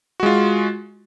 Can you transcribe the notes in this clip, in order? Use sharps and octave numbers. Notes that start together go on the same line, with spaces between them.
G#3 F4 F#4